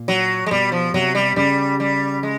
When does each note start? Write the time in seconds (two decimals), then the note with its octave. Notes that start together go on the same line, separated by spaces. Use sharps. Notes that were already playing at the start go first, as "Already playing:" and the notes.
Already playing: A#2
0.08 F#3
0.46 G#3
0.51 B2 G3
0.72 F3
0.94 C3 F#3
1.15 G3
1.36 C#3 G3
1.80 G3
2.23 G#3